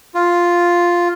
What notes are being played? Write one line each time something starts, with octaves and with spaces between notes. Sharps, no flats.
F4